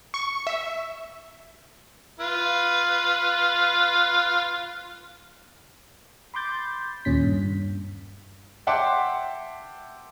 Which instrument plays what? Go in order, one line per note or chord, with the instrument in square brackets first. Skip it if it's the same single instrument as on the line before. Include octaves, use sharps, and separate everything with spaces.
[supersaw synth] C#6
E5
[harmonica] F4 B4
[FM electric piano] B5 C6 D6 G6 A6
D#2 A#2 C#4 B6
G2
[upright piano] E5 F#5 G5 A5 C6 D6